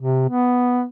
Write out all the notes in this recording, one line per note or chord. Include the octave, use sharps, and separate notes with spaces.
C3
B3